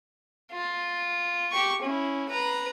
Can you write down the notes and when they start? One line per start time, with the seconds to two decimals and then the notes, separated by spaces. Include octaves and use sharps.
0.52 F4
1.52 G4 C#6
1.82 C#4 E4
2.29 B4 A#5